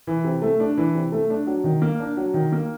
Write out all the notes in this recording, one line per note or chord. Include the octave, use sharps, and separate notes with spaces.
E3
C3
A3
D4
E3
C3
A3
D4
F#3
D#3
A#3
D4
F#3
D#3
A#3